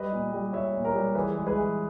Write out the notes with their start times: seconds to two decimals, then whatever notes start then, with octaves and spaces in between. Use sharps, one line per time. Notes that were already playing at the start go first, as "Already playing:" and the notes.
Already playing: G3 B4 D#5
0.13 A#2
0.33 G3
0.53 G3 C#5 E5
0.74 A#2
0.84 A#4 C#5
0.94 G3
1.15 E3 G#4 B4
1.36 G#3
1.47 G#4 B4
1.57 E3